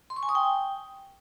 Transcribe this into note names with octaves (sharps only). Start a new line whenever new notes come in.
C6
C#6
G#5
D#6
G5